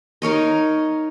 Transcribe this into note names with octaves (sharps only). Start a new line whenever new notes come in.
D#4 A#4 C#5 D#5